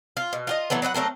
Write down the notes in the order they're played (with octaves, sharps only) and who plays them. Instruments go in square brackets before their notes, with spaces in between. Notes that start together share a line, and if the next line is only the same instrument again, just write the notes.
[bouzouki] F4
B2
F4 F#4 D#5
E3 F#3 A3 B3
F#3 B4 D5 F#5
F#3 A3 C4 A#4